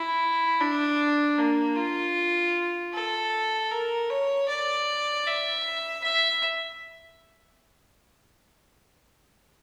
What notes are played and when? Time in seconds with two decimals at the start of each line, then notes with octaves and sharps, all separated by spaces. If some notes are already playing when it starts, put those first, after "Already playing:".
Already playing: E4
0.60 D4
1.38 A#3
1.76 F4
2.93 A4
3.71 A#4
4.10 C#5
4.48 D5
5.27 E5
6.03 E5